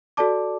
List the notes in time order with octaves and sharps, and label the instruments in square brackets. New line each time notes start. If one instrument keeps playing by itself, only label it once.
[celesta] F#4 A4 D5 A5 D6